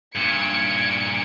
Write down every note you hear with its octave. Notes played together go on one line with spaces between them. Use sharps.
G2 A#2 G#6 C#7 D7